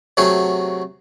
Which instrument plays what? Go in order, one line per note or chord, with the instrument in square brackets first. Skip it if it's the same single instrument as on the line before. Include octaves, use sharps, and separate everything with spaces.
[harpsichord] C3 F#3 A3 F#4 G#4